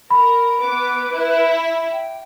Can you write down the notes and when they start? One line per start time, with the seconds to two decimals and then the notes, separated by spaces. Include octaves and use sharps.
0.10 A#4 B5
0.60 B3 B4 D6
1.12 E4
1.92 G5